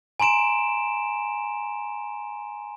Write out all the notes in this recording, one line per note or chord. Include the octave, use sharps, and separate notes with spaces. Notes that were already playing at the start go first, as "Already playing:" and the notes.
G#5 A#5 C6 D7 E7